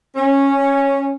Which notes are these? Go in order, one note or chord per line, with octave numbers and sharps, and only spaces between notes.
C#4